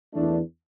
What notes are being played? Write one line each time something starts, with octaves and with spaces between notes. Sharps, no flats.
E2 E3 A3 D4